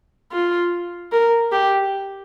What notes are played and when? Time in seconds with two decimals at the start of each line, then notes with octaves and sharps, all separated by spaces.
0.32 F4
1.12 A#4
1.52 G4